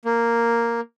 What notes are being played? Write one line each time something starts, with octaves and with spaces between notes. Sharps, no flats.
A#3